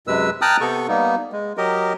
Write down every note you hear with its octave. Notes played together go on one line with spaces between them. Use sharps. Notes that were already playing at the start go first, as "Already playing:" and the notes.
F#2 C3 G#3 B4 E6
G5 A5 A#5 D#6 F6 F#6
C3 B3 A4 C#6
G3 A#3 B3 D#4
G#3
F#3 G4 A#4 D#5